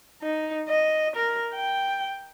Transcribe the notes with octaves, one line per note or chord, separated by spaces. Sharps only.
D#4
D#5
A#4
G5